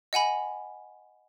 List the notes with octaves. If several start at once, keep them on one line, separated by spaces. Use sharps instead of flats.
D#5 F#5 G#5 B5